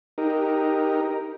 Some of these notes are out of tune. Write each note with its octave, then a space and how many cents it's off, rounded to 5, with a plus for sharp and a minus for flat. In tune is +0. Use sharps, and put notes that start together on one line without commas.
D#4 +0 G4 +0 A#4 +0